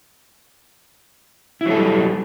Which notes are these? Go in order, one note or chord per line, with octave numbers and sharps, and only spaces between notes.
F#3 G3 E4 A4